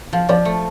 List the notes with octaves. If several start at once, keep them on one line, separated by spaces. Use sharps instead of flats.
F3 F5
F3 D5
A3